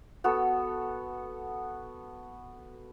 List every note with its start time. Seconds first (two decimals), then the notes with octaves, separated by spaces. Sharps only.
0.24 B3 F#4 A4